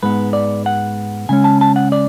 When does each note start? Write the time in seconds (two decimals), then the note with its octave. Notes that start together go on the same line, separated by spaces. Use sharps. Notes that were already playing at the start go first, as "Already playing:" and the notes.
0.03 G#2 G#3 B3 B4
0.33 D5
0.66 F#5
1.29 C#3 G#3 C#4 G#5
1.44 A5
1.61 A5
1.76 F#5
1.92 D5